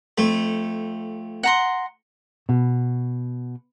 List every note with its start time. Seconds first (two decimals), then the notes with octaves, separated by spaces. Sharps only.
0.18 F2 A3
1.43 F#5 A#5 C6
2.49 B2